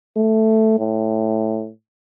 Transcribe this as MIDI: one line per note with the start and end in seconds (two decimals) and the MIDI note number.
0.17 0.76 57
0.79 1.70 45